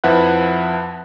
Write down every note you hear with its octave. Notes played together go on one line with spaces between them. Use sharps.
F2 F3 E4 B4 F#5 F#6